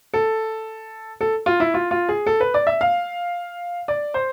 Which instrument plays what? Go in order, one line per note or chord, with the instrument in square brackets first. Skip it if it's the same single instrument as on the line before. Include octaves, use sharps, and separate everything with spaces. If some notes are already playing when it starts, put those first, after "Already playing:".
[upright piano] A4
A4
F4
E4
F4
F4
G#4
A4
B4
D5
E5
F5
D5
C5